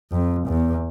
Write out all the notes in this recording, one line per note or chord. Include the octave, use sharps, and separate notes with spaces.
F2
E2